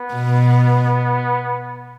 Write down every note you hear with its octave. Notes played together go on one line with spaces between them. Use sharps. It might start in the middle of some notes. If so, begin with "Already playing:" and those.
Already playing: B3
B2